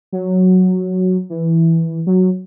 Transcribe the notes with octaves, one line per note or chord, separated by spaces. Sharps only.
F#3
E3
F#3